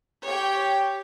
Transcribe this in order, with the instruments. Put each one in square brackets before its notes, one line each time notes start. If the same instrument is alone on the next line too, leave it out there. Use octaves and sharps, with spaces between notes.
[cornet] G4 [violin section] C#5 G5